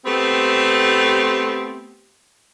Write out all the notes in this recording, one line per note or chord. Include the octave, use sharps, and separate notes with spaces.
A3 B3 C4 G4